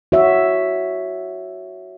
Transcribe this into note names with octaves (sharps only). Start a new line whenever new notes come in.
F#4 C#5 E5